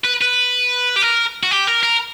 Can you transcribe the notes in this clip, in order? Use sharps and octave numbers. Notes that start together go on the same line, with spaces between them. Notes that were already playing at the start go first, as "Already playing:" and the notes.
B4
B4
G4
A#4
F#4
G4
A#4
A#4